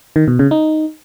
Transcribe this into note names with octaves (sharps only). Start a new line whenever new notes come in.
D#3
B2
C#3
D#4